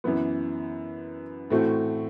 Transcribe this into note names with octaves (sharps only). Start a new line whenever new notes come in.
F#2 E3 B3
A2 E3 A3 C4 F#4